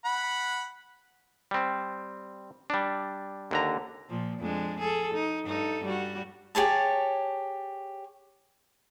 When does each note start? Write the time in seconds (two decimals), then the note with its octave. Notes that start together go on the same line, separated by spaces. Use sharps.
0.05 F#5 B5
1.51 G3 C4
2.70 G3 D4
3.51 D#2 D3 A#5
4.09 A#2 F3
4.39 F2 G#3 D4
4.79 G#4 A4
5.14 D#4
5.45 G2 D#4 A4
5.85 G3 F#4
6.55 G4 G#4 C#5 A5